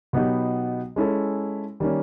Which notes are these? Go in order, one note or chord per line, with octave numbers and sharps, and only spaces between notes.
B2 F#3 B3 D#4 G4
G#3 C#4 E4 A4
D#3 G3 A#3 C#4